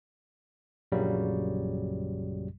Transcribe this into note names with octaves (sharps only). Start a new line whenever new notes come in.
A#1 F#2 A#2 C#3 F#3 G3